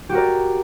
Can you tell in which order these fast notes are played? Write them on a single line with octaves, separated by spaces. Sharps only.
G4 F#4 A#4 D5